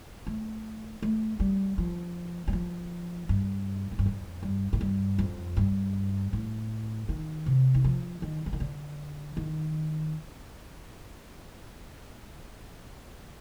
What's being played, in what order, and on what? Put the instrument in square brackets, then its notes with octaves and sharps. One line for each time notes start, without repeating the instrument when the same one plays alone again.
[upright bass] A3
A3
G3
F3
G3
F3
G2
A2
G2
F2
G2
A2
G2
F2
G2
A2
D#3
C3
D#3
F3
D#3
F3
D#3
D3
D#3